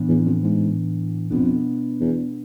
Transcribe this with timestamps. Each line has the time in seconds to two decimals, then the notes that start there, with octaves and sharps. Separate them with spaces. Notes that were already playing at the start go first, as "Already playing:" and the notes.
Already playing: A2 E3 B3 D4
0.08 E2
0.25 F2
0.43 G#2
1.31 F2 B2 B3 D4
2.00 E2